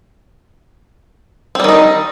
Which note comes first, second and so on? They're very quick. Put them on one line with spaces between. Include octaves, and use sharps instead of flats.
C4 G3 D#3 D#4